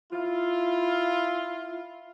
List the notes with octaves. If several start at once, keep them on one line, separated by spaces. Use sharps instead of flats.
E4 F4